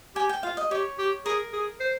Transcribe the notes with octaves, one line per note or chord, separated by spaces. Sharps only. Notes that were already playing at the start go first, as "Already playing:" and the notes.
G4 G#5
G5
F4 F5
D#5
G4 C#5
G4
G#4 A#4
G#4
C5